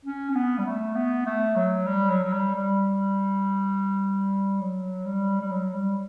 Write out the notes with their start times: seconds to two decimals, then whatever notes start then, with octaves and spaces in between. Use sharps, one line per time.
0.05 C#4
0.30 C#4
0.35 B3
0.58 G3
0.65 A3
0.95 B3
1.26 A3
1.56 F#3
1.87 G3
2.09 F#3
2.23 F#3
2.33 G3
2.54 G3
4.60 F#3
5.05 G3
5.40 G3
5.51 F#3
5.74 G3